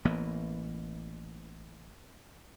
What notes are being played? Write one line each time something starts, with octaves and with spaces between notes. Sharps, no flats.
A1 E3 A#3 B3